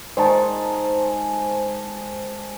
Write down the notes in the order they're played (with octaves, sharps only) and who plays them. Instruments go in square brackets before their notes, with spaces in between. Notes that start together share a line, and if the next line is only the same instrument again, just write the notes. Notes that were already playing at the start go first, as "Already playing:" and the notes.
[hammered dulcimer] D#3 G#3 [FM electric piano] C5 A5